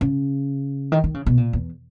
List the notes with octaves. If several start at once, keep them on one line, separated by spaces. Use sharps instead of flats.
C#3
D#3
D#3
C#3
B2
A#2
E2